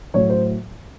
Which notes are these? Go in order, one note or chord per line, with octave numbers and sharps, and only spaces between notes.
A2 F#3 C#5
C5